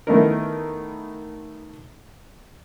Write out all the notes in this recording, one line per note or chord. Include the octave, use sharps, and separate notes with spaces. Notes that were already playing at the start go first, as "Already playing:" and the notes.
D#3 A3 B3 D#4 E4 A#4